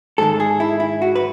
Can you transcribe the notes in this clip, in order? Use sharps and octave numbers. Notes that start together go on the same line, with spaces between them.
G#2 D#3 G#3 A4
G#4
E4
E4
F#4
B4